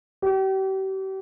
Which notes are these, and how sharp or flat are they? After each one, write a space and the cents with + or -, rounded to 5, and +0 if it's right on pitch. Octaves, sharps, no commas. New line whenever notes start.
G4 -40